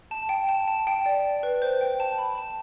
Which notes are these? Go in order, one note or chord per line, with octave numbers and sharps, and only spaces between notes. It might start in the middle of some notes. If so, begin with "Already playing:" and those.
A5
G5
A5
A5
G5
D5
B4
C5
G5
A5
B5
A5